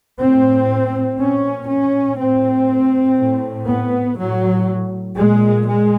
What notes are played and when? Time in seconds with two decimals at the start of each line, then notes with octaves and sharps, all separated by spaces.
0.20 A2 C4
1.19 A#2 C#4
1.69 C#4
2.19 A2 C4
3.18 A2
3.68 B3
4.18 A2 F#3
5.17 A#2 G#3
5.67 G#3